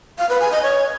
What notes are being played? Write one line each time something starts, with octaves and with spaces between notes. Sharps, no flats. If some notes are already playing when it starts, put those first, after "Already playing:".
F5
B4
G#5
D#5
C#5